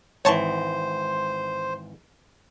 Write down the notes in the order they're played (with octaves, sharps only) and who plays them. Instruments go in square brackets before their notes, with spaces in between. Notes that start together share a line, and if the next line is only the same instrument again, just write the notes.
[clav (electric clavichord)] G#1 E3 [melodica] C5 [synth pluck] C#5 A5 C#6